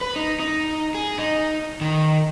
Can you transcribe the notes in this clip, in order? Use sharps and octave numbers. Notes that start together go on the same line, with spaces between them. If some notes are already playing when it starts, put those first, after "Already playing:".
B4
D#4
D#4
G#4
D#4
D#3